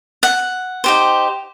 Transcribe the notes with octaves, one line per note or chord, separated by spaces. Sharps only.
F#5
D#4 G4 C5